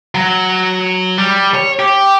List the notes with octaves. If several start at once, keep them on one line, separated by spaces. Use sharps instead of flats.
F#3
G3
C#5
G4